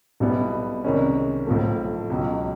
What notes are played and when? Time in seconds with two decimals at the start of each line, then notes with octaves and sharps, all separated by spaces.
0.20 B1 B2 G3 B3 E4
0.84 C2 C3 D#3 G#3 C#4
1.46 B1 A2 F3 A3
2.10 C#2 B2 F#3